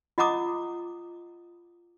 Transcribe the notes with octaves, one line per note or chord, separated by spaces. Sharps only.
F4 D#5 F#5 A#5 D6 D#6